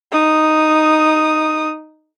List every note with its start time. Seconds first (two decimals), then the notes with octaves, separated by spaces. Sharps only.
0.12 D#4 D#6